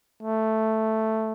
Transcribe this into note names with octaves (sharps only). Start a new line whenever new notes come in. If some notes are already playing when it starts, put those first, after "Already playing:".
A3